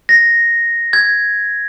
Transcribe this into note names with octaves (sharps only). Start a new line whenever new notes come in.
A#6
G#6